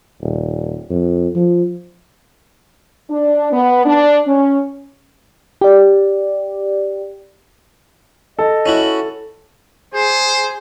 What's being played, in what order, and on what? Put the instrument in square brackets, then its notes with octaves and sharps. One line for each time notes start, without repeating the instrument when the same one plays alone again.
[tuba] D#1
F2
F3
[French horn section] D4
B3
D4
C#4
[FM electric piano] G4 D5
[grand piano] A4 [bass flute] D#5
[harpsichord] C#4 E4 F#4
[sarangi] G#4 [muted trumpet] C5